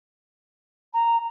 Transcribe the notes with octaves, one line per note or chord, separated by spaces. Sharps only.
A#5